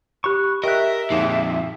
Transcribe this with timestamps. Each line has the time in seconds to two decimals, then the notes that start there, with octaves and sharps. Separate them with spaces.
0.24 G4 B5 C#6 F#6
0.64 G4 A#4 D#5 E5 G5 F#6
1.10 F2 A#2 D#4 G#4 F5